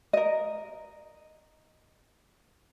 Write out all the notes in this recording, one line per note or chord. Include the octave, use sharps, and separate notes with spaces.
A#4 D#5